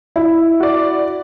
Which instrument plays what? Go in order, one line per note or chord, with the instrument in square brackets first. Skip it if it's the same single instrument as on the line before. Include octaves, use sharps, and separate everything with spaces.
[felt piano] E4
[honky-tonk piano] F#4 D5